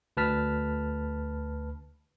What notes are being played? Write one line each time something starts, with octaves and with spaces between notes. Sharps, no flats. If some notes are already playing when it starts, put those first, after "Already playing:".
D2 B4 A5 F6 B6